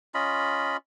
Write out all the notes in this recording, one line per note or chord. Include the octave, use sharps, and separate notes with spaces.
C#4 F4 D#5 B5